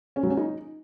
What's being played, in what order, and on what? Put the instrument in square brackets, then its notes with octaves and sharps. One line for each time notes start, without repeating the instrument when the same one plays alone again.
[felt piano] C#4
F#3
C#4
D#4